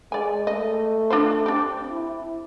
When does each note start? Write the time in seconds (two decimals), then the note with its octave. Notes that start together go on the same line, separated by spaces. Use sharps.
0.12 G#3 D5 G#5
0.47 A3 D#5
1.10 D4 F4 C5
1.46 C4 D4 G4
1.91 E4